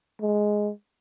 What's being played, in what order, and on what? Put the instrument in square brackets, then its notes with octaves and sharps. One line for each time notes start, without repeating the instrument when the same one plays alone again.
[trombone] G#3